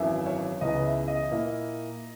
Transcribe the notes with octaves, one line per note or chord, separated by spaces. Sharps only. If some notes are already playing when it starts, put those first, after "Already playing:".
Already playing: G#1 F#2 E3 E5
C#5
C#2 C#3 E3 B3 D#5
E5
D#5
A#2 A#3 E4